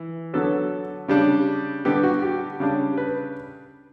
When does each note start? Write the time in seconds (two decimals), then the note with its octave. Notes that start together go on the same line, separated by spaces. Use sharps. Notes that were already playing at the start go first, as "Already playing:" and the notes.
Already playing: E3
0.33 D3 F#3 B3 A4
1.08 C#3 G3 D4
1.85 D3 G3 B3 G4
2.03 F#4
2.22 G4
2.60 C#3 G3 D4
2.97 B4